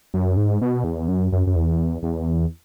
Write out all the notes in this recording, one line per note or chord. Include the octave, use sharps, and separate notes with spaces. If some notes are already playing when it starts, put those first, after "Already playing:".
F#2
G#2
B2
E2
F#2
F#2
F#2
E2
E2